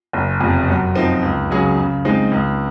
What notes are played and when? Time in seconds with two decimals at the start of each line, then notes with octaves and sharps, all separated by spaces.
0.13 F#1
0.41 F2 C3
0.68 F#2
0.96 F3 C4 D#4
1.22 C#2
1.50 C#3 F#3 C#4 G#4
1.78 C#3
2.05 G#3 C4 D#4
2.31 C#2